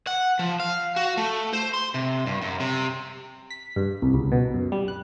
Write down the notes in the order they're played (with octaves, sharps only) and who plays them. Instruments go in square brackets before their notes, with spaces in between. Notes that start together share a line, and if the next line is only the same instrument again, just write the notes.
[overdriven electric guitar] F#5
F3
F5
F#4
A3
C5
C6
C3
G2
F#2
C3
[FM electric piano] B6
G2
C2
C#2
B2
F#2
G3
F#6